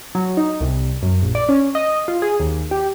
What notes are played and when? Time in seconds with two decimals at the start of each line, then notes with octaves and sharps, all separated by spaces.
0.15 F#3
0.37 D#4
0.61 C2
1.03 F#2
1.22 A#1
1.35 D5
1.49 C#4
1.75 D#5
2.08 F4
2.22 G#4
2.40 D#2
2.71 G4